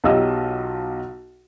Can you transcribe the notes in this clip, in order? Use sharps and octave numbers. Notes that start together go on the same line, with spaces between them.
B1 F#3 F4 G4 D#5 E6